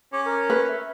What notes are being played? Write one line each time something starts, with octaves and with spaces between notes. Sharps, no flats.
C#4 D6
A#4
B4
E5